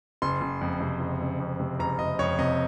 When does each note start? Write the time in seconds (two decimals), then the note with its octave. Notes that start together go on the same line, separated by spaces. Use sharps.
0.22 F#1 C6
0.41 F#1
0.61 F2
0.80 C3
1.00 F#1
1.21 F#1
1.40 F2
1.60 C3
1.79 F#1 A#5
1.99 F#1 D#5
2.19 F2 C#5
2.39 C3 D#5